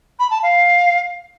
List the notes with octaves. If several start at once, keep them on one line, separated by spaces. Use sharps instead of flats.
B5
A5
F5